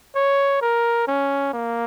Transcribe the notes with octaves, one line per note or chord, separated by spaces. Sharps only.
C#5
A#4
C#4
A#3